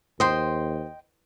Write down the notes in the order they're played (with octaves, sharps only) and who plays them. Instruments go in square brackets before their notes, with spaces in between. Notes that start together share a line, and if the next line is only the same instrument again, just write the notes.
[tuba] D#2 [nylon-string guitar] C5 [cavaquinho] D#5 G5 C6